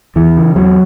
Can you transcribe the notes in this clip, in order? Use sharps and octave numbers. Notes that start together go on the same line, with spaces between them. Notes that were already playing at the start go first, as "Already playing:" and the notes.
E2 E3
C#3
E2 F#3